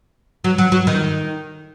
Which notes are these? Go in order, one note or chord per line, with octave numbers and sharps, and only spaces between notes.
F#3
F#3
F#3
D#3